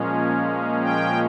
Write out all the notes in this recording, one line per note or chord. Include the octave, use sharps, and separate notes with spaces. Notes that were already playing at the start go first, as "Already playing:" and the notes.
Already playing: A#2 F3 G#3 C#4
G5